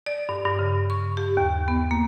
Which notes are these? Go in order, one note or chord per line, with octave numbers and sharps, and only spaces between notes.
D5
G2
G2
C#3
C#6
G4
D#2
B3
A#3